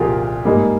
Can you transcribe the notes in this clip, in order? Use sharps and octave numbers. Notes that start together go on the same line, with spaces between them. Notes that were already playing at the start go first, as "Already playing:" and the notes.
Already playing: C2 A#2 F3 F4 G4 G#4 A#4
G#2 G3 A#3